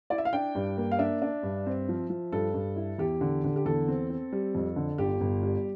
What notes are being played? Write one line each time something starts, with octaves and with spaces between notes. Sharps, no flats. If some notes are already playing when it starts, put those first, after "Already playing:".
E4 D5
E5
F5
D4 G5
G2
A#3
F5
D4 E5
D4
G2
C4
F3
F3
G2 A4
G2
E4
E2 G4
D3
D3
G4
E2 A4
C4
C4
G3
F2
D3
G1 G4
G1
G3